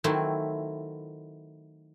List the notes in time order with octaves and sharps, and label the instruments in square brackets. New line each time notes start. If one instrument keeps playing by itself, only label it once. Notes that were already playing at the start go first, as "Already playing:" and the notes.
[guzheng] D#3 F#3 A3 C4 E4